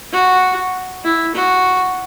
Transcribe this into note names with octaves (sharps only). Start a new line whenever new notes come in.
F#4
E4
F#4